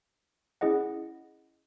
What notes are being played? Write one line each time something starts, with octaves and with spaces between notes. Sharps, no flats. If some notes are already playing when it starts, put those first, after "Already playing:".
C#4 E4 G#4 D#5 F#5